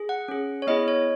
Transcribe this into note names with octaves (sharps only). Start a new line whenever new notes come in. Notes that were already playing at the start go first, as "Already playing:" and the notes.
Already playing: G#4
F#5
C#4 G#4
C#5
B3 E4 G#4 D#5
C#5